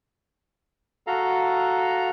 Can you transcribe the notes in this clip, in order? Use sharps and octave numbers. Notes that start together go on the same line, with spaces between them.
F#4 A4 F5 A#5